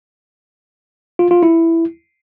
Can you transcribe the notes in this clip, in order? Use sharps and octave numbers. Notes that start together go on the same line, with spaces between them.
F4
F4
E4